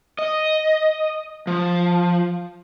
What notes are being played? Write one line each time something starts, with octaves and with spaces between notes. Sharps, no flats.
D#5
F3